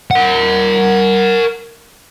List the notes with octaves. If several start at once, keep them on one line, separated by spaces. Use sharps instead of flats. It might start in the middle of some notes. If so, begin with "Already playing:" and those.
A#4 F#5